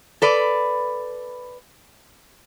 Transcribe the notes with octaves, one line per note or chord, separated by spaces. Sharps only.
A4 B4 D5